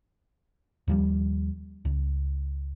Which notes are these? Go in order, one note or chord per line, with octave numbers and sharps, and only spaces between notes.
D#2 F3 G3
C#2